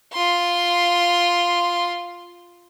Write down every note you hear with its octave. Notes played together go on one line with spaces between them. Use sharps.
F4 C6